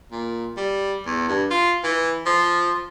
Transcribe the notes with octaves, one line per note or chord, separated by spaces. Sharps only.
A#2
G3
E2
G2
F4
E3
F3